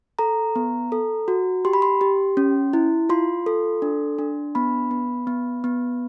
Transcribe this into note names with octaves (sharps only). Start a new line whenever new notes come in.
A4 A#5
B3
A4
F#4
G4 C6
B5
C6
G4
C#4
E4
F4 C6
A4
D4
D4
B3 B5
B3
B3
B3